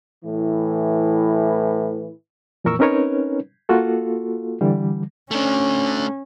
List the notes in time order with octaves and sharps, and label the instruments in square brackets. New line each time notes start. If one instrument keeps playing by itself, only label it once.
[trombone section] A2 E3
[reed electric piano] F2 A#2 E3 A#4 C#6 E6
C4 C#4 D#4 A#4 B4 C#5
A#3 F4 F#4 A4
D3 E3 G3
[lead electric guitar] A3 D4 [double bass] C#4